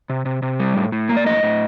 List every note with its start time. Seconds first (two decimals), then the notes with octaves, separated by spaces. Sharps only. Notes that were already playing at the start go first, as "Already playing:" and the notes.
0.10 C3
0.25 C3
0.42 C3
0.59 G3
0.76 A2
0.92 A2
1.09 A#3
1.17 D5
1.26 A2 D#5
1.43 A2